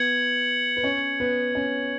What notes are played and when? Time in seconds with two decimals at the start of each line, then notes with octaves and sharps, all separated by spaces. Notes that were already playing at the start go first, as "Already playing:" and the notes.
Already playing: B3 B4 G#6 C#7 F#7
0.77 B4
0.83 C#4 C#5
1.20 B3 B4
1.55 C#4 C#5